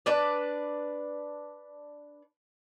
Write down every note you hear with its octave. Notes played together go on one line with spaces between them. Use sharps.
D4 B4 D5